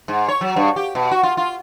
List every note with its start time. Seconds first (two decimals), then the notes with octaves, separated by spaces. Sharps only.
0.08 G#2
0.28 C#5
0.41 F#3
0.56 G2
0.76 G4
0.95 B2
1.11 F#4
1.23 F4
1.37 F4